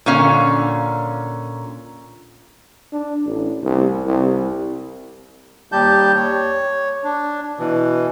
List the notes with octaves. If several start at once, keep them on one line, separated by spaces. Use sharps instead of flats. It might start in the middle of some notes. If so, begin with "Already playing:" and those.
A#2 D3 C#4 F5
D4
A1
C2
C2
D#2 G3 G4 A5 G6
C#5
D4
B2 E3